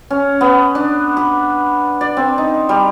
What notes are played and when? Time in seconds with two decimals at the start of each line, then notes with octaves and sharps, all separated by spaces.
0.10 C#4
0.41 B3
0.75 D4
1.17 B5
2.01 D5
2.17 C4
2.38 D#4
2.69 G3